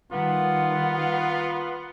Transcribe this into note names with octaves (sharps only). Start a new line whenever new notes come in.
D#3 G3 A#3 B3 F4 F#5